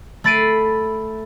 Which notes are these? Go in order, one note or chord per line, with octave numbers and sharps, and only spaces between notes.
A3 B5 A6 C7 D7 D#7